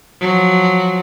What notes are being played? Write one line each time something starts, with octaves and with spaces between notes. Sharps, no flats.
F3 F#3